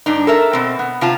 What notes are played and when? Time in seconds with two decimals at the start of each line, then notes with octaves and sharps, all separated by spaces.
0.06 G2 D4 D#4
0.27 A4 A#4 E5
0.53 B2 C4
0.79 B3
1.01 C3 F4 A5